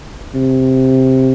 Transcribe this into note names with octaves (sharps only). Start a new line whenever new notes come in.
C3